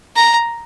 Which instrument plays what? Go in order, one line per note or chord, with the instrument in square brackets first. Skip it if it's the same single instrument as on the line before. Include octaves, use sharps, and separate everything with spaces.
[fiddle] A#5